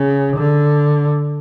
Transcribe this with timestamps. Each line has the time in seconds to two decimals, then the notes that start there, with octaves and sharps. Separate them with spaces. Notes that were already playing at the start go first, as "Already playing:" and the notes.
Already playing: C#3
0.37 D3